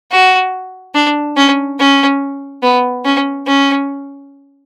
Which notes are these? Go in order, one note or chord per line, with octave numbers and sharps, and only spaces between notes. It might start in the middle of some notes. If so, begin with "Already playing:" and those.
F#4
D4
C#4
C#4
B3
C#4
C#4